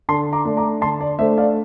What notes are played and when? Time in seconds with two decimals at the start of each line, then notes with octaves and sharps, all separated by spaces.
0.09 D3 A5 C6
0.33 A#5 D6
0.45 A3 D4
0.57 A#5 D6
0.82 D3 A5 C6
1.01 D5
1.19 A3 D4 C5 E5
1.38 D5 F5